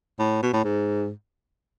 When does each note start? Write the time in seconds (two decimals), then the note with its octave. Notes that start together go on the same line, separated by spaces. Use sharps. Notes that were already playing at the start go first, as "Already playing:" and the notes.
0.19 A2
0.43 B2
0.53 A2
0.64 G#2